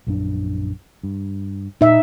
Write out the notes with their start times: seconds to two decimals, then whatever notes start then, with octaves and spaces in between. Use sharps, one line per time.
0.07 A#1 F#2 D4
1.03 G2
1.81 A#2 D#4 E5